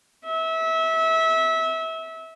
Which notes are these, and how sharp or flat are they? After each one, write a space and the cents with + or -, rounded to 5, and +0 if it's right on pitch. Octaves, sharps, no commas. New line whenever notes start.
E5 -25